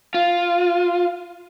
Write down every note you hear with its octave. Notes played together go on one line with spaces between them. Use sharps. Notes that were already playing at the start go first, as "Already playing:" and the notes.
F4